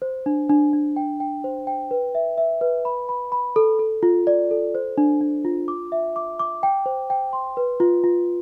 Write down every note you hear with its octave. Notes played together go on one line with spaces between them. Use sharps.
C5
D4
D4
D4
G5
G5
C5
G5
B4
E5
E5
B4
B5
B5
B5
A4
A4
F4
D5
A4
C5
D4
D4
F4
D6
E5
D6
D6
G5
C5
G5
C6
B4
F4
F4